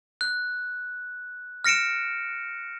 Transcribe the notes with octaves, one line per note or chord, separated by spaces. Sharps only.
F#6
F6 A#6 C#7 D7 E7